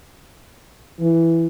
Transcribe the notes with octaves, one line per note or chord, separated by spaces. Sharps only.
E3